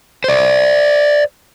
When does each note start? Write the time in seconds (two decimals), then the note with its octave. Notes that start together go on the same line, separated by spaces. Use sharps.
0.24 C5 D5